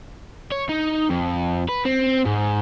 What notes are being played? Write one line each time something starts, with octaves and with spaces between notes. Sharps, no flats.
C#5
D#4
F2
B4
C4
G#2